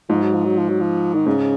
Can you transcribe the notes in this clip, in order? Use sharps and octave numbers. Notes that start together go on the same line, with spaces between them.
G#2 F3
F#3
F3
F#3
F3
F#3
F3
D#3
G#2 C#3